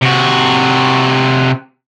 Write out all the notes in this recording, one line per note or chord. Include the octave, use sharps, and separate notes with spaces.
C3 F#4